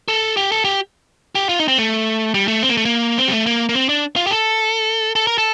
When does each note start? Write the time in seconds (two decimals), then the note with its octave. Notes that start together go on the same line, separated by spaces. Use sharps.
0.08 A4
0.37 G4
0.52 A4
0.65 G4
1.35 G4
1.49 F4
1.59 D#4
1.68 C4
1.78 A3
2.34 G3
2.48 A3
2.62 C4
2.70 A#3
2.78 A3
2.85 A#3
3.18 C4
3.28 G3
3.32 A3
3.46 A#3
3.69 A#3
3.75 C4
3.89 D4
4.16 F4
4.27 G4
4.31 A4
5.15 A4
5.27 A#4
5.38 A4